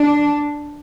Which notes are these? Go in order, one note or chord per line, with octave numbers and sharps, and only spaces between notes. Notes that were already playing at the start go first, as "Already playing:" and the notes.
Already playing: D4